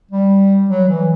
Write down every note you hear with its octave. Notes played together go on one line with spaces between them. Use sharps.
G3
F#3
E3